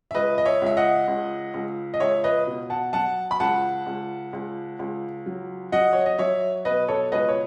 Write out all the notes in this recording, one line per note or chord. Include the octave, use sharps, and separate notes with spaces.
E5
C#2 B4 D#5
D#5
C#5 E5
C#2 E5
D#5 F#5
C#2
C#2
D#5
C#2 C#5 E5
B4 D#5
B2
F#5 A5
F#3 F#5 A5
B5
C#2 F#5 A5
C#2
C#2
C#2
F#3
F#3 D#5 F#5
C#5
D#5
F#3 C#5 E5
B2 B4 D#5
A4 C#5
C#2 B4 D#5
C#5